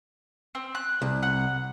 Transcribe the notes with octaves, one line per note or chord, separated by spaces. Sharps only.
C4
F#6
C2
F#5